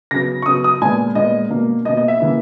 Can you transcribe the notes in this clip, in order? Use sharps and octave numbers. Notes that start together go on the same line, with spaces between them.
C#3 F#3 B3 A#6
C#6
C#3 F#3 B3 D#6
D#6
A#2 G#3 B3 G#5
A#2 G#3 B3 D#5
B2 A#3
B2 A#3 D#5
D#5
E5
C#3 E3 A#3